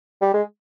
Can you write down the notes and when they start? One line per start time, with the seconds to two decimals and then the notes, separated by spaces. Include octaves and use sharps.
0.21 G3
0.34 G#3